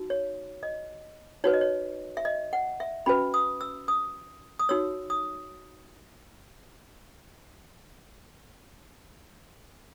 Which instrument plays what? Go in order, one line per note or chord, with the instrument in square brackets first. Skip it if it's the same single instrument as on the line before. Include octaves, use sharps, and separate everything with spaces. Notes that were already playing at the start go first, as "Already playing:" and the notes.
Already playing: [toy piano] D#4 F#4
C#5
D#5
D#4 F#4 B4 C#5
D#5
C#5
E5
D#5
F#5
E5
C#4 F#4 B4 B5
D#6
E6
D#6
D#6
D#4 F#4 C#5 E6
D#6